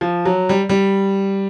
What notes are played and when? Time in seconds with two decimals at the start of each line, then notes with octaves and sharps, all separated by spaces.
0.01 F3
0.25 F#3
0.49 G3
0.69 G3